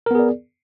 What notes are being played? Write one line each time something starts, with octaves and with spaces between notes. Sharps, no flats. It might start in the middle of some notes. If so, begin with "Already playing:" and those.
B3 G#4 A#4 D5